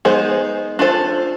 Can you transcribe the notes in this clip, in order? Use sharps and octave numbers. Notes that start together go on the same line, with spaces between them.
G#3 B3 D#4 G#4 C5
D4 F4 A4 C5